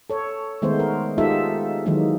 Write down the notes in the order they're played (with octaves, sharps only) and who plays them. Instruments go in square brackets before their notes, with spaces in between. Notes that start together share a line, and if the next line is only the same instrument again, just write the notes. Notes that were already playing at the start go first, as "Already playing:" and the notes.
[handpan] A4 C#5
D#3 G#3 A3 B3 C5
A#4
G#3 D#4 F4 G4 A4 E5
D#3 E3 F#3 G#3 A#3 D#4